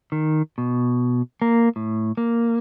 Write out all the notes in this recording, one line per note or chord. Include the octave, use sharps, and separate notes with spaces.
D#3
B2
A#3
A2
A#3